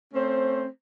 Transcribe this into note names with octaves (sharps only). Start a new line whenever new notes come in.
A3 C4 C#4 C5